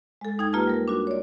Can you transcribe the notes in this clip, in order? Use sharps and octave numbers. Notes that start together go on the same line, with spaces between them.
G#3 A4
E2 D#4 G5 G#6
A#3 F4 G4 B4 A5
G3 A#4
D4 F#4
C#5 D5